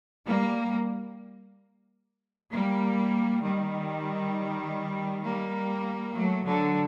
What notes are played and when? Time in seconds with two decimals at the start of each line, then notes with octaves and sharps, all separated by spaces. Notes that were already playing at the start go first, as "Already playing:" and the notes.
0.25 G3 A#3
2.52 G3 A#3
3.43 D#3 G3
5.24 G3 A#3
6.15 F#3 A3
6.45 D3 F#3